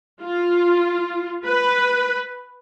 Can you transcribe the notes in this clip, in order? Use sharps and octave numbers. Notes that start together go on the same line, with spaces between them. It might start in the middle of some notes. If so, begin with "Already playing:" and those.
F4
B4